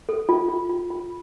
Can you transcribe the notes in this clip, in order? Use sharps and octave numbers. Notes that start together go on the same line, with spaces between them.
A4
F4
F4
F4
F4